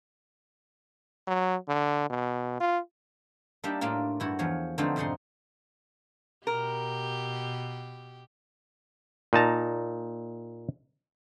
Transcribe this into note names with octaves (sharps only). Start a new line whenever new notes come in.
F#3
D3
B2
F4
G3 A#3 D4 D#4 G4 E5
A2 A3 A#3 D4 F4
G2 E4 F#4
E2 F3 C#5
D3 F3 A3 B3 C4 D#4
F2 G#2 C3 D#4 F#5 C6
B2 G4 A#4
A#2 D#4 A5 A#5